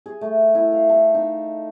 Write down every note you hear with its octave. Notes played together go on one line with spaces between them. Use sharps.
G#4
A3
E4
F5
A4
D#4